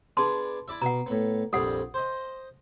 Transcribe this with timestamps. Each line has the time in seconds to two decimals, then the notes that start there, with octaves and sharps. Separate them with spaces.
0.17 B3 D4 G#4 A5 C6
0.68 E4 D5 E5
0.82 B2 F#5 A#5
1.06 A2 B3
1.53 A#1 F2 G3 A4 F#5
1.94 C5 D#5